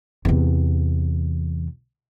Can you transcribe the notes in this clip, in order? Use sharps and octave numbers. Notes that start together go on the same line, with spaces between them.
E2 C3